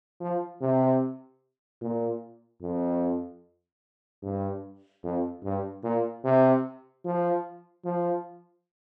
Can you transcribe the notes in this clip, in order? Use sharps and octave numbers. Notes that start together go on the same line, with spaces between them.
F3
C3
A#2
F2
G2
F2
G2
A#2
C3
F3
F3